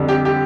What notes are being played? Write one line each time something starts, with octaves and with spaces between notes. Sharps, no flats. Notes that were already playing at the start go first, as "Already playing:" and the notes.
Already playing: F2 D3 G3
G4
G4